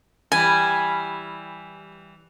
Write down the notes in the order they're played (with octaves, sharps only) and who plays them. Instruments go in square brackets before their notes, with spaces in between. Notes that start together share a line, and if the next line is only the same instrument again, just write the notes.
[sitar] E3 G3 [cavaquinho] G#5